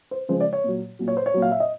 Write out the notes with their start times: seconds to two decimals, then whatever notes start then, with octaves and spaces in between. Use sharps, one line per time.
0.11 C5
0.29 C#3 F3 G#3 C5
0.40 D5
0.53 C#5
0.64 A#2 F#3
0.99 A#2 F#3
1.08 C#5
1.17 C5
1.26 C#5
1.34 A#2 F#3
1.42 F5
1.51 E5
1.60 D#5